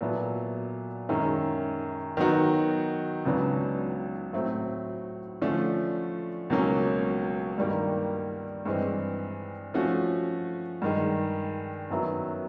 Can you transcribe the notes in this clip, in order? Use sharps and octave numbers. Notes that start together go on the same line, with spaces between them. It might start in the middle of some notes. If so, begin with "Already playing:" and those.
A#2 F#3 B3 E4 A4
F#2 D#3 G#3 C#4 E4
D#3 F#3 B3 D#4 F#4
C#2 C#3 F#3 B3 D4
A2 F#3 A3 C4 E4
D3 F3 A3 C#4
C#2 B2 F#3 A#3 C#4
G2 D#3 G3 A#3
G2 E3 G#3 C4
F3 A3 C#4 F#4
G2 D#3 G#3
F#2 D#3 F#3 B3 E4